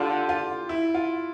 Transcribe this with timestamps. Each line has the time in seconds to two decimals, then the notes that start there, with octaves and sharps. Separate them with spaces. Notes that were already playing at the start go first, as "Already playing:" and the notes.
Already playing: D3 F4 G4
0.29 F4
0.69 E4
0.95 F4